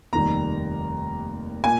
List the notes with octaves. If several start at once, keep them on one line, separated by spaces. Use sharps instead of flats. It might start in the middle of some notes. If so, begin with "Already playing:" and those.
F1 D#2 D#3 G3 A#5
A#2 G#5